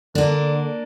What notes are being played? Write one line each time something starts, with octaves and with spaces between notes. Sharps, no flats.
D3 A#3 D4